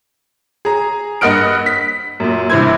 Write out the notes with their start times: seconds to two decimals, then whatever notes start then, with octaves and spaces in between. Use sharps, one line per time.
0.65 G#4 A#5
1.21 G2 A#3 D#5 F#5 F6 D7
1.66 B6
2.20 F#2 A#2
2.50 G2 C3 E3 C5 E6 G#6